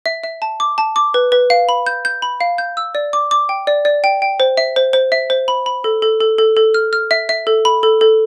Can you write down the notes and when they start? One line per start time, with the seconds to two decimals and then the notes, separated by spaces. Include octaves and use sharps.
0.06 E5
0.24 E5
0.42 A5
0.60 D6
0.78 A5
0.96 D6
1.14 B4
1.32 B4
1.50 F5
1.69 B5
1.86 G6
2.05 G6
2.22 B5
2.41 F5
2.58 G6
2.77 E6
2.95 D5
3.13 D6
3.31 D6
3.49 G5
3.67 D5
3.85 D5
4.04 G5
4.22 G5
4.40 C5
4.57 E5
4.76 C5
4.93 C5
5.12 E5
5.30 C5
5.48 B5
5.66 B5
5.84 A4
6.02 A4
6.21 A4
6.38 A4
6.57 A4
6.74 F6
6.93 F6
7.11 E5
7.29 E5
7.47 A4
7.65 B5
7.83 A4
8.01 A4